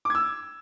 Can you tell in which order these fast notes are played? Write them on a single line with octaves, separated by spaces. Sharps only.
D6 G#6 E6